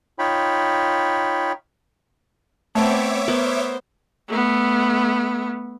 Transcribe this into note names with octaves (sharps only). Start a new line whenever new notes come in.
D#4 F4 C#5 G5 B5
A3 B3 C4 C#5 E5 D6
B3 A#4 C5
A3 B3